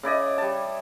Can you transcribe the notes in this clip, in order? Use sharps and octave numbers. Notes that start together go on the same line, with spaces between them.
C#3 E4 D5 D#5
G3 A5